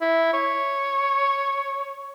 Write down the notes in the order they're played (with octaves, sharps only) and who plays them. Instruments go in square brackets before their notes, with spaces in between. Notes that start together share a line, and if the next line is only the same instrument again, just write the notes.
[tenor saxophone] E4
C#5